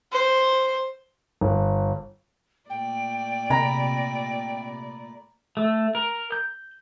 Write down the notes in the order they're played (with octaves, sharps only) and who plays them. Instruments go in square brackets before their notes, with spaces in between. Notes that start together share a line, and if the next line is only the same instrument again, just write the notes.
[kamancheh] C5
[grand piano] G1
[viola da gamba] A#2 A3 D5 [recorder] G5
[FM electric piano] C3 [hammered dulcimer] A#5 B5
[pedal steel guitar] A3
A#4
G6